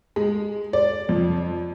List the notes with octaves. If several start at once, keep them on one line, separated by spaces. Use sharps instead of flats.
G#3
D5
F2